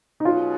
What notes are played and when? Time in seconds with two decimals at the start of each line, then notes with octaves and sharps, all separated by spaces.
0.20 D#4
0.25 B2 F#3 C#4 F4 G#4 B4